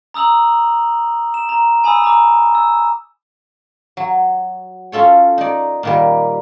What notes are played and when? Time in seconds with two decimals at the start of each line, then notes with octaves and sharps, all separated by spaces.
0.14 A#5 D#6 E6 F7 F#7
1.34 E7
1.49 A#5
1.84 G#5 B5 D#6 E6
2.04 A#5 D6
2.55 E6
3.97 F#3
4.92 C#4 F4 A4 C#5
5.38 D#4 D5
5.83 A#2 D#3 G3